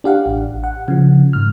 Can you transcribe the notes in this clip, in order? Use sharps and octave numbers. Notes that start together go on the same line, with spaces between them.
D4 G4 F5 F#5
A1
F#5
C#3 F3
G#2 F6